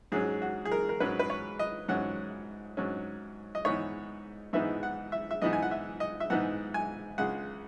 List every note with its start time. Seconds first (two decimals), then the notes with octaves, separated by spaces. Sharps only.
0.12 G#2 F#3 C#4 G#4
0.42 F#4
0.65 G#4
0.72 A#4
0.89 A#4
1.00 G#2 F#3 C#4 B4
1.19 B4
1.30 C#5
1.59 D#5
1.88 G#2 F#3 C#4 F#5
2.77 G#2 F#3 C#4
3.55 D#5
3.65 G#2 E3 B3 D#4 C#5
4.53 G#2 E3 B3 D#4 E5
4.83 F#5
5.12 E5
5.31 E5
5.42 G#2 E3 B3 D#4 D#5
5.53 G#5
5.63 F#5
5.71 E5
6.00 D#5
6.20 E5
6.30 G#2 E3 B3 D#4 F#5
6.74 G#5
7.18 C#2 C#3 G#3 F#5